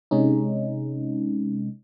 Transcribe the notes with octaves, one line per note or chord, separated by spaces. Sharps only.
C3 G#3 C#4 D#4